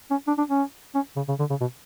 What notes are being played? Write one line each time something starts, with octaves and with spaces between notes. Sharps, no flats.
C#4
D4
D4
C#4
C#4
C#3
C#3
D3
C#3
B2